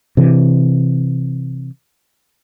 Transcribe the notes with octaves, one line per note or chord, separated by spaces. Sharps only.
C3 E3